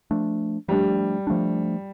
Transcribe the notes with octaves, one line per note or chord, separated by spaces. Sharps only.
F3 A3 D4
F3 G3 A3 D4
F3 A3 D4